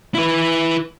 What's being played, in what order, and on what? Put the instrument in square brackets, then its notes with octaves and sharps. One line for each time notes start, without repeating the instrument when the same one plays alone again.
[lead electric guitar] E4 B4